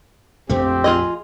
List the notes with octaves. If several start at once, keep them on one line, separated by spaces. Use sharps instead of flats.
A#1 F2 A3 C4 G4
F4 G#4 D#5